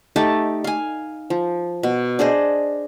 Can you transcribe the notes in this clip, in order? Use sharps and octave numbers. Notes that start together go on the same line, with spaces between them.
A3 D#4 G4 A5
F5 G#5
F3
B2
D4 G#4 C5 D#5